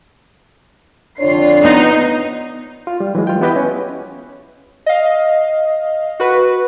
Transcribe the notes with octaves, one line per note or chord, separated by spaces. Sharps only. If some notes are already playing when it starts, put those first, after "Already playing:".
F2 D3 D4 F4 C#5 C7
B3 D#4
F4
G3
E3 F#3 G#3
F4 G5
B3 E4 G4 B4 D#5 G5
C#4
D#5 F5
F#4 B4